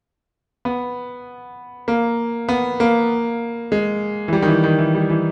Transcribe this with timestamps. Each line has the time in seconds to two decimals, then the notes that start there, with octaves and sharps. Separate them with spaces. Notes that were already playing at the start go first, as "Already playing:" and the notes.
0.65 B3
1.88 A#3
2.49 B3
2.80 A#3
3.72 G#3
4.28 E3
4.33 G3
4.42 D#3
4.48 E3
4.64 D#3
4.78 E3
4.94 G3
5.10 E3